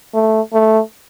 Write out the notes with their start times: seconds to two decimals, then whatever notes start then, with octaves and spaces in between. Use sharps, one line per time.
0.14 A3
0.53 A3